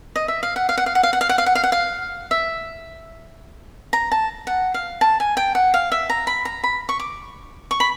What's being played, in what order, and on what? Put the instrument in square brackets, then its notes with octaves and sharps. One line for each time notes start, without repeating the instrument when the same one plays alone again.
[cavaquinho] D#5
E5
F5
F#5
F5
F#5
F5
F#5
F5
F#5
F5
F#5
F5
F#5
F5
F#5
F5
E5
A#5
A5
F#5
F5
A5
G#5
G5
F#5
F5
E5
A#5
B5
A#5
B5
C#6
D6
C#6
B5